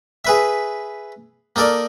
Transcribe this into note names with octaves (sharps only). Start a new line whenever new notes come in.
G#4 B4 E5
A#3 D#4 A4 A#4 D5